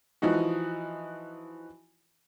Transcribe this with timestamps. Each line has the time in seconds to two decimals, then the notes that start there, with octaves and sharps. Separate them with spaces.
0.22 E3 F3 D#4 F#4